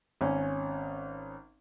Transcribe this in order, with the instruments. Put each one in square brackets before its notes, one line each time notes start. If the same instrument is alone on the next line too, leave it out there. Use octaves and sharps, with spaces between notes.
[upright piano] G#1 C#4